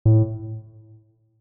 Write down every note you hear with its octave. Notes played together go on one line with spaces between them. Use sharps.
A2